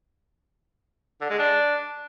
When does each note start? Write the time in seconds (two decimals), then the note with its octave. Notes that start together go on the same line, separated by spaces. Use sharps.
1.21 D3
1.30 G#3
1.38 D4